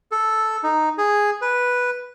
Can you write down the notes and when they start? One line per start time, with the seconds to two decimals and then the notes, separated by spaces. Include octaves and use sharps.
0.12 A4
0.63 D#4
0.98 G#4
1.41 B4